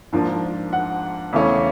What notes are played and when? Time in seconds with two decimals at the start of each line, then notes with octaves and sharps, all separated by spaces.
0.12 G#2 F3 A#3 D4
0.73 F#5
1.33 E2 C#3 E3 A3 C#4